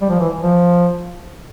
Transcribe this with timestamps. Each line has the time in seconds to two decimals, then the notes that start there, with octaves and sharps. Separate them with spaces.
0.02 G3
0.09 F3
0.20 E3
0.40 F3